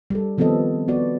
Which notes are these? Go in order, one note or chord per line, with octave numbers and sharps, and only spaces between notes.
G3 A4
D#3 F3 B3 C4 A4 D#5
B3 F#4 D5